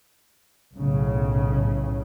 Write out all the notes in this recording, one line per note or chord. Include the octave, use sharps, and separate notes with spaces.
B1 A2 C#3